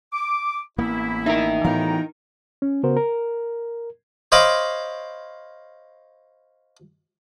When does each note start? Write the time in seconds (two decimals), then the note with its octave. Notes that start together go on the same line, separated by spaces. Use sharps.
0.13 D6
0.78 A1 A#3 B3 E4
1.26 D#4 A#4 E5
1.64 A2 E3 B3 F#4 F5 G5 A#5
2.62 C#4
2.83 C#3 B3 F#4 A#4 C5
2.97 A#4
4.32 C5 C#5 D#5 F5 B5 D6